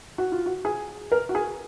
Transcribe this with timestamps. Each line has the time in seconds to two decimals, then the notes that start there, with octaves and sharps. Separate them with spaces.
0.18 F#4
0.32 F4
0.46 F#4
0.65 G#4
1.12 A#4
1.29 F#4
1.35 G#4